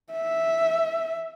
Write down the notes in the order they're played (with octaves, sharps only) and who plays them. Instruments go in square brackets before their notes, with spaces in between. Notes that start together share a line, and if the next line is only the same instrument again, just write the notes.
[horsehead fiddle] E5